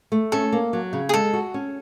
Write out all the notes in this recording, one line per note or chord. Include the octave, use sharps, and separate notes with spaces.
A3
C#4 A4
A#3
F#3
C#3
G#4
G#3 A4
F#4
C#4